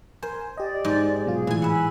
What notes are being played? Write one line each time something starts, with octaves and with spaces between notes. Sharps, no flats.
A#4 C5 G#5
G4 D5 D#5
G#2
B2 F#3 F4 G#4
A2 E3 G#5
E5 F#5 G#5 B5